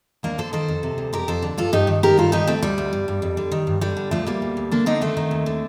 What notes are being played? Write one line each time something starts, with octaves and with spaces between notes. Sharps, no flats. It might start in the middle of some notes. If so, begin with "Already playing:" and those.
D#2 A#3 D4
D3 A4 C5
D#3 A4 C5
F2
C3
D2
F2 G4 A#4
F2 A4 C5
D3
G2 F4 A4
G2 D#4 G4
D#3
D#3 G4 A#4
G2 F4 A4
D#3 D#4 G4
D2 A3 C4
D2 G3
D2
G2
G2
F2
D3
D#3
G2
D3 G3
D3
D2 F3 A3
D2 G3 A#3
D2
D2
D3 A#3 D4
D3 C4 D#4
D#3 A3 C4
D#3
D#2
D3